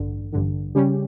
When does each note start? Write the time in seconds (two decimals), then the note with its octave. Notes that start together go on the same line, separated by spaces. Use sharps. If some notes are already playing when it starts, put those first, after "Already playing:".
Already playing: A1 G2 D3
0.33 A1 G2 D3
0.75 C#3 G3 C#4 G4